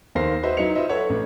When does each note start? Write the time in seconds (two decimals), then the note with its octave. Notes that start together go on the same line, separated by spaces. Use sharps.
0.15 D#2 A#4 C5 A#6 C7
0.43 F#4 B4 C5 D#5 E5
0.57 F#3 D#4 E4 E5 C#7 F7
0.75 F4 B4 C5 D#5 E5
0.89 A4 B4 C#5 F#5
1.10 A1